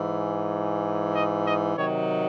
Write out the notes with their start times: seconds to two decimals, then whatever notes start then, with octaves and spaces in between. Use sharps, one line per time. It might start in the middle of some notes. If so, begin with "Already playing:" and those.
Already playing: G#2 E3
1.15 D#5
1.47 D#5
1.77 C3 D#3 F#3 C#5